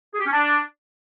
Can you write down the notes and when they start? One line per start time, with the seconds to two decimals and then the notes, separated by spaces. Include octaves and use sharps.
0.14 G#4
0.20 G4
0.26 C#4
0.33 D4